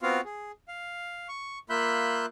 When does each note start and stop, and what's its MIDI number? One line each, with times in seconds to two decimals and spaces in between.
0.02 0.21 59
0.02 0.21 60
0.02 0.21 65
0.02 0.21 66
0.02 0.21 77
0.25 0.52 68
0.68 1.28 77
1.29 1.59 85
1.70 2.26 58
1.70 2.26 65
1.70 2.26 76
1.70 2.26 83
1.70 2.26 90
1.70 2.26 91